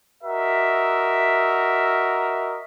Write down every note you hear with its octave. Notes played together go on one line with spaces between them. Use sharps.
F#4 A#4 D#5 E5